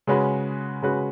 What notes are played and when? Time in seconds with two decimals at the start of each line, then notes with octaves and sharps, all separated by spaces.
0.07 C#3 G#3 C#4 F#4 B4
0.82 C#3 G#3 C#4 F#4 B4